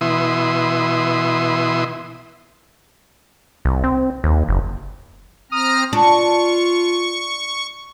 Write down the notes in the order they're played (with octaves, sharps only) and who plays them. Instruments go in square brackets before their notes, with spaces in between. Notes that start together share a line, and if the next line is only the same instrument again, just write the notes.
[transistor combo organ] B2 E3 E4 C6 D#6
[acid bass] C2
C4
D#2
F#1
[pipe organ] C4 A#5 F6 [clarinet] D#6
[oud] D4 [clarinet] F4 [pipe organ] C#6